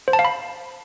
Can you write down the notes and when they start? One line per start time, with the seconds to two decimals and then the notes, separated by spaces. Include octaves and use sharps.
0.08 C5
0.13 A5
0.19 F5
0.25 B5